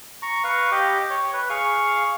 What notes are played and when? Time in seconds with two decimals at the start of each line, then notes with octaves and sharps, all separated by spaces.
0.22 A#5 C#6
0.44 B4 F5 C#6
0.72 G4 D#5 D6
1.10 C#5
1.33 B4
1.50 G#4 F5 C#6